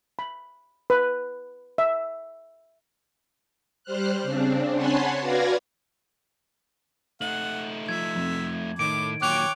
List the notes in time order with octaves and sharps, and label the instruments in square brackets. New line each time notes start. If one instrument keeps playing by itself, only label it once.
[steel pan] B5
B4
E5
[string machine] G3 C5 F6 F#6
C#3 C4 D4
C#5 F#5 G#5 A5 B5 C6
F#4 B4 D5 F5 G#6 A#6
[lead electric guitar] A3 D#4 [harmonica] F#5 [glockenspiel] F#7
[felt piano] F3 [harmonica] E5 [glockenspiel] G#6
[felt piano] F2
[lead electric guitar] A2 [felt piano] D#3 [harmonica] D6 [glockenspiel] D7
[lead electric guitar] A#2 F#3 [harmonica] C#5 G5 D6 [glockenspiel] F#6 F7